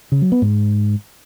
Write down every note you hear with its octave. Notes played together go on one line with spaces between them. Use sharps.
C#3
F#3
B3
G#2